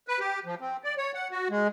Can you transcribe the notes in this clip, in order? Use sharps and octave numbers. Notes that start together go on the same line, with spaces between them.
B4
G4
F3
C4
D5
C#5
F#5
F#4
G#3